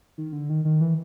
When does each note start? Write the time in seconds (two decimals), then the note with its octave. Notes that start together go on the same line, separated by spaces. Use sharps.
0.18 D#3
0.33 D3
0.50 D#3
0.65 D#3
0.81 E3